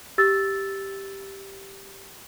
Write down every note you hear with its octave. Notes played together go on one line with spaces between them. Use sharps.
G4 E6 A6